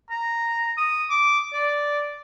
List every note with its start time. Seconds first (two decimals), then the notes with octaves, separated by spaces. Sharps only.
0.10 A#5
0.77 D#6
1.10 D6
1.53 D5